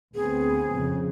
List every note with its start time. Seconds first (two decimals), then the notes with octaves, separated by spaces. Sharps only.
0.15 D2 B3 C4 G#4
0.74 F2 C#3